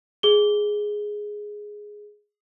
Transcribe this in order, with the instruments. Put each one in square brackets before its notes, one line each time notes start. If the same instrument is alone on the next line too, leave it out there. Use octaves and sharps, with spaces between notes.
[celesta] G#4 G7